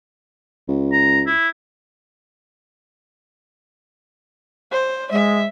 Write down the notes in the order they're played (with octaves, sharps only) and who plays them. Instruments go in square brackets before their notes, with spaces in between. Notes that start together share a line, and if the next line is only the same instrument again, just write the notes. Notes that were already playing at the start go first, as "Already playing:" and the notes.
[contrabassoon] C#2
[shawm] A#5
E4
[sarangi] C5
[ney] G#3 [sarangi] E5